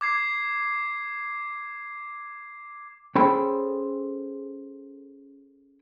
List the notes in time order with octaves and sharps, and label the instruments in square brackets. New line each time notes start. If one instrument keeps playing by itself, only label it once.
[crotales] D6 G#6 C7
[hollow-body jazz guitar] C#4 G#4 A4 C5 G5 B5